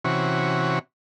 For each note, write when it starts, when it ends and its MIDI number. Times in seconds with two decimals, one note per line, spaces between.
0.05 0.79 48
0.05 0.79 52
0.05 0.79 61
0.05 0.79 66